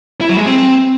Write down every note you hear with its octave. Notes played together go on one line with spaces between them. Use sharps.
E4
F#3
G#3
C4